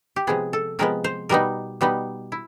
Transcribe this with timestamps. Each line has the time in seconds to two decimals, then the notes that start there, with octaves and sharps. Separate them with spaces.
0.16 G4
0.27 C3 F3 G#3 B3 G#4
0.53 A4
0.79 C3 F3 G#3 B3 A#4
1.04 C5
1.29 B2 G3 B3 D#4 A#4
1.81 B2 G3 B3 D#4
2.32 E4